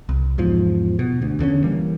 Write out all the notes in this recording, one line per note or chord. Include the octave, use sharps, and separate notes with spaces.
C2
E2 G#2 F3
B2
D2
E2 D3 D#3 C#4
E3 G3 A#3